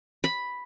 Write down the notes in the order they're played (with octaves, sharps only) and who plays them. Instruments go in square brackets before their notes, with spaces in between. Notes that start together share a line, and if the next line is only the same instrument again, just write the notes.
[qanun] B5